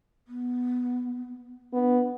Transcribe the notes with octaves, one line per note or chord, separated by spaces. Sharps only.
B3
B3 D4